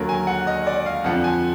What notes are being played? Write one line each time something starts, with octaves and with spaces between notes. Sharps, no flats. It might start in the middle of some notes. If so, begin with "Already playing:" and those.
Already playing: D#2 D3 F#3 A#4
G#5
F#5
D#5
D5
F5
F2 D3 F3 F#5
G#5